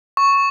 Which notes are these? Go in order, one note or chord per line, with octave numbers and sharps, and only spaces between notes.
C#6